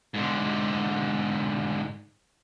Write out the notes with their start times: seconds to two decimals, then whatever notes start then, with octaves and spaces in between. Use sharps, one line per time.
0.14 G#2 D3